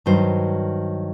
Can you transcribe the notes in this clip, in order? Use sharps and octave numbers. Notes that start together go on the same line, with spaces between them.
G2 D#3 F#3 C5